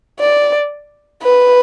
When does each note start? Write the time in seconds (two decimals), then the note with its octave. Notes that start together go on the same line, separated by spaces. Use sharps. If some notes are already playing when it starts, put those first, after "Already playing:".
0.20 D5
1.23 B4